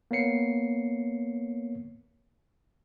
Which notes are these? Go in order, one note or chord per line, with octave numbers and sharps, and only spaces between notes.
A#3 B3 C#5 C7 C#7